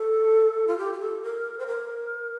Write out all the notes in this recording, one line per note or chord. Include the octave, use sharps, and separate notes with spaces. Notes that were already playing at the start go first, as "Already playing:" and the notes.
Already playing: A4
F4
G4
G4
A4
A#4
C5
A#4